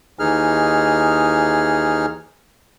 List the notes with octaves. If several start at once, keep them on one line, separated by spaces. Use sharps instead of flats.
D#2 E3 D#4 G#4 F6